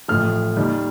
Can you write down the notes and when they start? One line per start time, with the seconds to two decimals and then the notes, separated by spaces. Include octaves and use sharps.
0.08 A1 A2 F3 F6
0.56 D#2 D#3 G3